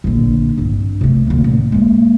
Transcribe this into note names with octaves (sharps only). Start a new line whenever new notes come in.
A#1 D3
G2 C4
C3 A3
D2 A#3
A1
G#3 A#3